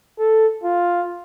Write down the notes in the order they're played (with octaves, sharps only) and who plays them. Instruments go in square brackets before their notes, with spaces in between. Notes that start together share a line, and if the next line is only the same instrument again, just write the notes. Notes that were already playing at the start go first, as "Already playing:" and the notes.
[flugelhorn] A4
F4